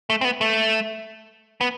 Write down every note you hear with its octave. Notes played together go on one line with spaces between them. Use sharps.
A3
C4
B3
A3
B3